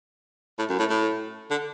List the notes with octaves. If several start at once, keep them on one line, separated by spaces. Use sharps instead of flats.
A2
F#2
A2
A2
D3